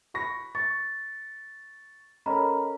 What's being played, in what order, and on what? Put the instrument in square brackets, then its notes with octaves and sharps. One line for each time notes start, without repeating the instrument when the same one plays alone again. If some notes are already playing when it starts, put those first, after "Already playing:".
[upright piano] B5 C#6 A#6
[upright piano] C#6 [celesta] A6
[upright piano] C#4 A4 A#4 [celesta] D#5 A#5 B5